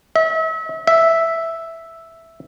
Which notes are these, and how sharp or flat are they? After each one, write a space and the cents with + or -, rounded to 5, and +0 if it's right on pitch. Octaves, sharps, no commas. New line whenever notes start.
E5 -35
E5 +0